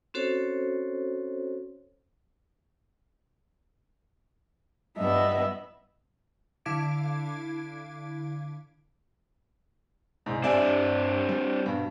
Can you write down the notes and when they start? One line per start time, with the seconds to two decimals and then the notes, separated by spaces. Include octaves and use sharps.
0.14 C4 C#4 F#4 A4 C5 C#5
4.98 G2 B3 D#5 E5
6.66 D3 E4 F5 D6 G#6 D7
10.26 C2 G#2
10.44 G2 C4 D4 D5 E5 G#5
11.29 G3
11.66 G2 B2